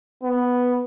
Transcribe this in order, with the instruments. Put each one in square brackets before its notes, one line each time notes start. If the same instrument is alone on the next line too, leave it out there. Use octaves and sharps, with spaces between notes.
[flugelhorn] B3